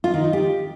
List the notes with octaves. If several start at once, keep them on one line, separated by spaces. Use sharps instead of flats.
F4
D#3
D#4
G4